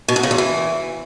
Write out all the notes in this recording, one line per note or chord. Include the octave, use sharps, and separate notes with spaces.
B2
F#2
C#3
E2
E3